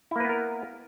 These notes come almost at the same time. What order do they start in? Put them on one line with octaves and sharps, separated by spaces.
E4 A#3 B4 B3 A#4